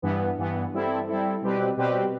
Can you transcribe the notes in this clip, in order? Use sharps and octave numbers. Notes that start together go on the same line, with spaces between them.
G2 E3 B3
G2 E3 B3
G3 C4 E4 A4
G3 C4 E4 A4
B2 G3 C4 G4 B4
B2 G3 C4 G4 B4